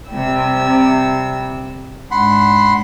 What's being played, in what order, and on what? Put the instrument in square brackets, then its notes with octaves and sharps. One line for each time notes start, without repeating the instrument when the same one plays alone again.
[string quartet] C3 G3 E6
[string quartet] G#2 D4 [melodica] F#5 B5 C6